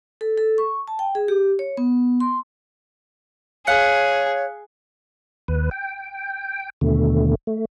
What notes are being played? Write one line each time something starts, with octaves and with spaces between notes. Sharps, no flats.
A4
A4
C#6
A5
G5
G#4
G4
C#5
B3
C6
G#4 C#5 F5 F#6 C#7
D#2 B4
G5
D#2 B2 D3 A3
A3